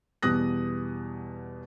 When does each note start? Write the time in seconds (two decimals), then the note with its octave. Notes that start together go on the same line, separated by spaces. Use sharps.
0.22 E2 B2 G3 D#6 F#6 A#6